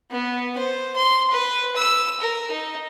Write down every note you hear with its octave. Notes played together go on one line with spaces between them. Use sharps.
B3
C5
C6
B4
E6
A#4
D#4